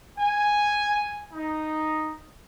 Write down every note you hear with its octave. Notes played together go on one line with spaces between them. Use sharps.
G#5
D#4